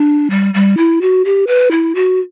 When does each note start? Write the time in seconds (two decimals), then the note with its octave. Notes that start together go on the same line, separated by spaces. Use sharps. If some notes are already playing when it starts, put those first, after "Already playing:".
Already playing: D4
0.30 G3
0.54 G3
0.77 E4
1.01 F#4
1.25 G4
1.47 B4
1.71 E4
1.95 F#4